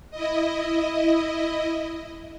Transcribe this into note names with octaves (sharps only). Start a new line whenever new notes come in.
E4 D#5